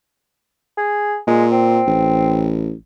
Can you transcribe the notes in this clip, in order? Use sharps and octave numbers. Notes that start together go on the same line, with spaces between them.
G#4
A#2 G#3
C4
A1